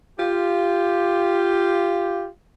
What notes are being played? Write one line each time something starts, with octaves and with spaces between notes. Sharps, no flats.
F4 G4